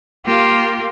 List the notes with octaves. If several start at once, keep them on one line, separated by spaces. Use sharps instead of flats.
A#3 F4 G4